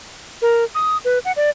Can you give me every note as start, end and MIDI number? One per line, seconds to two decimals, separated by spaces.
0.42 0.64 70
0.75 0.97 87
1.05 1.19 71
1.25 1.32 78
1.36 1.50 74